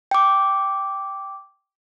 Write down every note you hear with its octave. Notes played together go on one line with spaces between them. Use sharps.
G5 D6